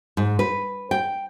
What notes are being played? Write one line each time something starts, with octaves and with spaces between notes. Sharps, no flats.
G#2
B4
G5